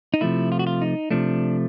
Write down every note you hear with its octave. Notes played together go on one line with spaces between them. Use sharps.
D#4
C3 F3 A3 E4
F4
F#4
F4
D#4
C3 F3 A3 D4